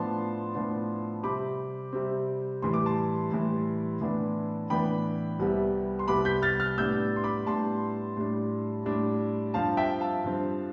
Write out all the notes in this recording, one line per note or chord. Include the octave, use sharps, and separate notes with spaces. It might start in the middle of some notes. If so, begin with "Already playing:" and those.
Already playing: A2 F3 B3 D4 A5 C6
A2 F3 B3 D4
C3 G3 C4 B5 D6
C3 G3 C4
A2 E3 G3 C6
D6
A5 C6
A2 E3 G3
A2 E3 B3 D4
A2 E3 B3 D4 G5 B5
C2 C3 G3 B3
C6
C2 C3 G3 B3 B5 D6
G6 B6
F6 A6
F6 A6
A2 G3 B3 D4 E6 G6
C6
B5 D6
A2 G3 B3 D4 A5 C6
A2 G3 D4
A2 G3 D4
G2 F3 C4 F5 A5
E5 G5
F5 A5
G2 F3 C4